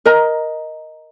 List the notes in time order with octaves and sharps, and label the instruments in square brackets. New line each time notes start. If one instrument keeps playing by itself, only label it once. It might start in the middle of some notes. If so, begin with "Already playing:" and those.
[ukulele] A#4 D#5 A#5